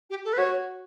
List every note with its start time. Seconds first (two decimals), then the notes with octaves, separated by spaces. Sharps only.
0.10 G4
0.24 A4
0.32 B4
0.37 F#4 C#5